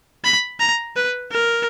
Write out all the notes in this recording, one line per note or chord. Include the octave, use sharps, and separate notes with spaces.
B5
A#5
B4
A#4